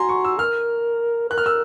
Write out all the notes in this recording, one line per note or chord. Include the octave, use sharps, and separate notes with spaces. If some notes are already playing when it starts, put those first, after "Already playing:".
Already playing: F#4 G#5 A#5 C6
C#6
E6
A#4 F6
A#4 F#6
F6
E6